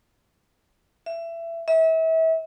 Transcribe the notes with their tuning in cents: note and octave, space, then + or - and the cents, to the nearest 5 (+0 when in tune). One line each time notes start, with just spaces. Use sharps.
E5 +25
E5 -35